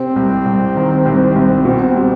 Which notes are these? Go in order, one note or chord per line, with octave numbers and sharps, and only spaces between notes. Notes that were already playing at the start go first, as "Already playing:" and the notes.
Already playing: C3 C4
C2
C2
D#3
C2
C2
B2
G3